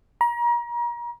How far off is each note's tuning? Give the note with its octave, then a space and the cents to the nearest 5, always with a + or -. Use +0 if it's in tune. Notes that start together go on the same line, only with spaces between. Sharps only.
A#5 +35